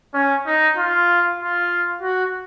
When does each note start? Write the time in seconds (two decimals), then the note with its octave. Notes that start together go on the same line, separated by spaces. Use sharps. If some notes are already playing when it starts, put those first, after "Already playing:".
0.14 C#4
0.46 D#4
0.77 F4
1.40 F4
2.02 F#4